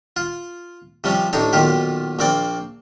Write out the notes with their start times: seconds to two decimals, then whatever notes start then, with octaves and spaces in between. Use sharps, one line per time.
0.16 F4
1.04 C3 F3 G3 C#4
1.33 A1 A2 D4 D#4 C#5
1.53 B1 A#2 D#3 F4 G4
2.19 A#1 A#3 C4 D5 G5